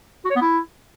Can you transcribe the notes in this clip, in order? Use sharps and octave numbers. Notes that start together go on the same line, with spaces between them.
F#4
C#5
B3
E4